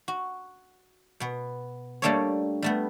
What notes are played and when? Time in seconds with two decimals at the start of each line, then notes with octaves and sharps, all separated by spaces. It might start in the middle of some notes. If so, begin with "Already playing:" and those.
0.08 F#4
1.20 B2 B3
2.02 G3 A3 A#3 D4 A4 C#5
2.62 G3 A3 B3